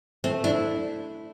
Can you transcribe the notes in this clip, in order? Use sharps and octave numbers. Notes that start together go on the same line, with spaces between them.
A3 C4
D4 E4